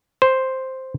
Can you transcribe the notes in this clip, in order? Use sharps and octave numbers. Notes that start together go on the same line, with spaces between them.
C5